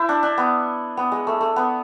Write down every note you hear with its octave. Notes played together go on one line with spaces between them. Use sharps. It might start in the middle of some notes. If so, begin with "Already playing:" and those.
Already playing: E4 C5
D4
D4
B3
B3
G#3
A3
A3
B3